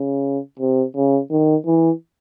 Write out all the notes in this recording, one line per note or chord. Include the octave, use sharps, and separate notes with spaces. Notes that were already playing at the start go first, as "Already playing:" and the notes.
Already playing: C#3
C3
C#3
D#3
E3